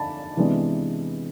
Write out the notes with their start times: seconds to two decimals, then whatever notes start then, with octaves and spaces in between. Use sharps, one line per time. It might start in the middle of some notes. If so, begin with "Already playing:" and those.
Already playing: D3 A5 B5
0.37 C3 E3 G#3 B3 D4